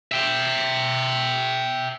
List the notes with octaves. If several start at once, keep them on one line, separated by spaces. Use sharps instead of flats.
E5 G5